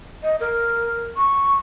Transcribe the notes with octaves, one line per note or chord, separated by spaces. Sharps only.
D#5
A#4
C#6